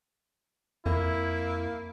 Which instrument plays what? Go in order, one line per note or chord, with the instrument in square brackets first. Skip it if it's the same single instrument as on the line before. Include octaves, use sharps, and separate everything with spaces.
[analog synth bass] F2 [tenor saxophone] A#3 [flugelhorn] E4